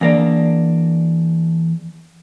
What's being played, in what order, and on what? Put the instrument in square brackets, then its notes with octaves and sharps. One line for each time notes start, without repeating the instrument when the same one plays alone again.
[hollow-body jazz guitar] E2 A#3 D4